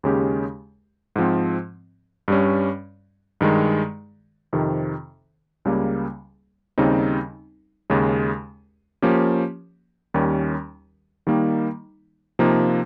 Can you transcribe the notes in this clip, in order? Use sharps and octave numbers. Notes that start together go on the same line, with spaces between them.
D#2 C#3 G#3 C#4 G4
G#2 F3 C4
G2 G3 C#4
G2 D#3 G#3
F2 C3 D#3
C#2 C#3 G3 A#3
D#2 C#3 G3 C4 D#4
D#2 C#3 G#3
F3 A#3 C#4 G4
D#2 D#3 G3 C#4
D#3 G3 A#3 D#4
C3 F3 A#3 D#4